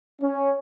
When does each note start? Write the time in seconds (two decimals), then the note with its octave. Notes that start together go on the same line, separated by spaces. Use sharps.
0.22 C#4